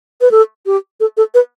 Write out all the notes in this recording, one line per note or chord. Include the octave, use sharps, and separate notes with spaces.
B4
A4
G4
A4
A4
B4